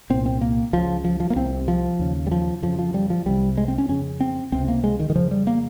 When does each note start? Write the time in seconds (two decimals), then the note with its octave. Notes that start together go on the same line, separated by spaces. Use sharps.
0.10 C2 A#2 C4
0.26 C4
0.41 A#3
0.73 C#2 C#3 F3
1.05 F3
1.20 F3
1.30 A#3
1.36 C2 C3 C4
1.68 F3
1.99 D#2 C#3
2.27 G3
2.31 F3
2.62 F2 C#3 F3
2.79 F3
2.94 G3
3.10 F3
3.26 C2 C3 G3
3.57 G#3
3.68 C4
3.78 C#4
3.89 F2 C#3 C#4
4.20 C4
4.52 C#2 C3 C4
4.68 A#3
4.84 G#3
4.99 D#3
5.10 D#3
5.15 F2 C#3 F3
5.31 G3
5.47 A#3